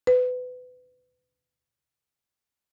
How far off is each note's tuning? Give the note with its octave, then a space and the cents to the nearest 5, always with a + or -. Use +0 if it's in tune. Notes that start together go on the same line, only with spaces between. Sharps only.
B4 +25